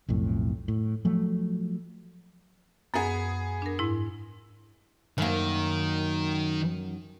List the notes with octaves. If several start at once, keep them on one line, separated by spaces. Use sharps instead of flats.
B1 F2 A2
A2
F3 F#3 A3
F#2 B3 G#4
D4 A#4
G#2 E4
F#2 D#3 A#3